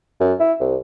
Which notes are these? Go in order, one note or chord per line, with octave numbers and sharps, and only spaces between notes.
F#2
E4
C2